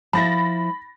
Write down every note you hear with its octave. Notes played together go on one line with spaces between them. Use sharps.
F3 E4 E5 B5 A6 A#6